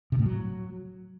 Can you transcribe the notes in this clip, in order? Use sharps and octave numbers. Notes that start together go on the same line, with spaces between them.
C3
A2
F#3